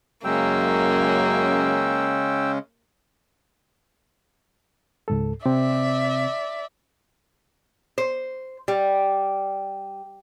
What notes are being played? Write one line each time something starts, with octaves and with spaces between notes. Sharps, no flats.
F#2 C#3 G#3 A#3 C#4 G5 E6
C#2 G#2 A4
C3 C4 D5 E5
C5
G3